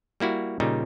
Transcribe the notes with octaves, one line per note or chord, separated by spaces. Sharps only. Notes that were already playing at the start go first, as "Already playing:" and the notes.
G3 A#3 E4 F#4
A#2 C#3 G3 D#4